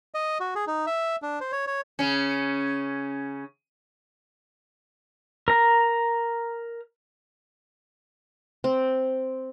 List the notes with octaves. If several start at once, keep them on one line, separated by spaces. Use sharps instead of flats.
D#5
F#4
G#4
D#4
E5
D4
C5
C#5
C#5
C#3 C#4
A#4 A#5
C4